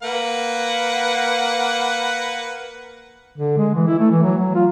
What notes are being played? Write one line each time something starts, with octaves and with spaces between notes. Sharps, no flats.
A#3 B4 F#5
D3
G#3
E3
E4
A3
E3
F#3
F#3
F4